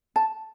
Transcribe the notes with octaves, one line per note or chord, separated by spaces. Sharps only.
A5